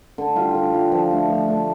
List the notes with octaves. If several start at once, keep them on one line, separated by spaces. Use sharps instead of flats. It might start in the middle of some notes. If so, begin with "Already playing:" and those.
D3
G3 F4
D3
G3 F4
F3
A3 D4
F3
A3 D4